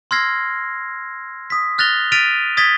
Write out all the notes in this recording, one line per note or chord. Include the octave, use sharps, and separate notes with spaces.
C6 E6 F6 G#6 A#6 C7
D#6 B6
F6 F#6 A6 A#6 F7 G7
F6 A6 B6 D7 D#7 F7
D#6 G#6 A6 B6 G7